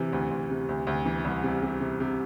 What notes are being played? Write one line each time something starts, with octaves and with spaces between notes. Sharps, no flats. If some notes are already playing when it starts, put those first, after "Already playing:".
Already playing: C3 E3
D2
D2
C3
D2
D2
E3
C2
C3
C3
C3
C3